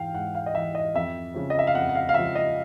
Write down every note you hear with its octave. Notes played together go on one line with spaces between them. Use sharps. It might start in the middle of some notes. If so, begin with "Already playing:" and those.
Already playing: G#2 E3 F5 G5
G#2 F#5
F5
D#5
E3 E5
D#5
F2 E5
C#3 F3
D#5
E5
F5
F2 F#5
F#5
F5
F5
C#3 F3 E5
D#5